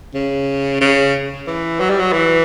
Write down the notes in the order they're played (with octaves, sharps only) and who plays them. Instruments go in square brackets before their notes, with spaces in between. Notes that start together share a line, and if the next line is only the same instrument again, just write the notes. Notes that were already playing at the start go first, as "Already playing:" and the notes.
[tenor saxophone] C#3
C#3
E3
F#3
G3
F#3
E3